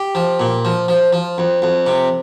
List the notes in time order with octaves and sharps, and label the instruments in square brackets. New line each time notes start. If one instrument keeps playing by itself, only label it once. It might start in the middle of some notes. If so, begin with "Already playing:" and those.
Already playing: [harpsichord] G4
F3
A#2
F3
F3
F3
F2
F2
C3